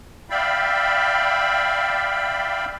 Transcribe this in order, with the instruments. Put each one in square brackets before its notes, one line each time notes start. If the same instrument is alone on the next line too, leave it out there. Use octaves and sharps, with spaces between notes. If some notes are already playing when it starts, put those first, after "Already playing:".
[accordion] D5 E5 F5 G5 B5